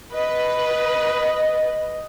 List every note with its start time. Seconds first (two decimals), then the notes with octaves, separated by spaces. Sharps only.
0.14 B4 D#5